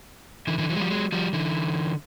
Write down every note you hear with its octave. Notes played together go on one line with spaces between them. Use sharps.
D3 E3
D3 E3
E3 F#3
G#3
F3 G3
F#3 G#3
F3 G3
D3 E3